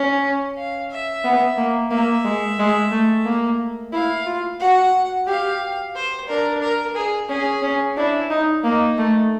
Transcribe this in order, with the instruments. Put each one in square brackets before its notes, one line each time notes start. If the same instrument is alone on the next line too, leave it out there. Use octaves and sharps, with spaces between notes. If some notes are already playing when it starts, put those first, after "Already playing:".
Already playing: [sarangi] C#4
[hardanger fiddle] F5
E5
[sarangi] B3
A#3
[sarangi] A#3 [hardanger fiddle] E5
[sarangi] G#3
G#3
A3
A#3
[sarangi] E4 [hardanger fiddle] F5
[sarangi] F4
[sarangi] F#4 [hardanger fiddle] F#5
[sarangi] G4 [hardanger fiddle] F5
[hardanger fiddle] C5
[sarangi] D4 [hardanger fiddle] A#4
[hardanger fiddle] A#4
G#4
[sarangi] C#4 [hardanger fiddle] G#4
[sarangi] C#4
[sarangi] D4 [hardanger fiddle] E4
[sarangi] D#4
[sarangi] A#3 [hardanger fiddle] D#4
[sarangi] A3